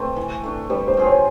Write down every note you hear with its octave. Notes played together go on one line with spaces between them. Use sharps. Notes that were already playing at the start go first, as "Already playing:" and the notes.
Already playing: C3 A3 C4 B4
E3
A3 D4
G3 B4
C5
C4 F4 G#4
C#5